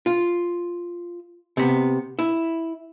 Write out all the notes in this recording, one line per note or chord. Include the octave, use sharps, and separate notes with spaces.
F4
C3 B3
E4